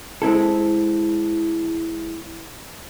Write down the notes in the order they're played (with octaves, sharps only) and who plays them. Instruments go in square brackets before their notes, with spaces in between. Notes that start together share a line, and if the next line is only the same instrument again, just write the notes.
[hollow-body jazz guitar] G#3 C4 E4 A4